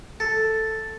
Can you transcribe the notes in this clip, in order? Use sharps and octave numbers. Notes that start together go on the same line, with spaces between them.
A4